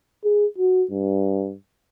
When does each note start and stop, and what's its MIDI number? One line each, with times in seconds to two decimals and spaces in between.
0.24 0.46 68
0.58 0.84 66
0.90 1.54 43